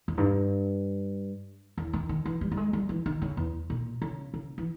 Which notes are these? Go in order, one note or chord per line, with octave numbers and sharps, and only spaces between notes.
E2
G2
E2
D#3
D#3
E3
G3
G3
G#3
G3
E3
D#3
C#3
E2
A#2
C#3
C#3
E3